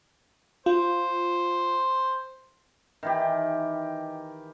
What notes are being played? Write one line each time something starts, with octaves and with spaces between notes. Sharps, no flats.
F4 C5
D#3 E3 G4